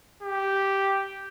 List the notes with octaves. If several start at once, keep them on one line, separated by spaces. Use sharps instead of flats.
G4